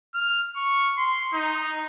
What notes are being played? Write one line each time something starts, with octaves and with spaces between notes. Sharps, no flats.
F6
C#6
C6
D#4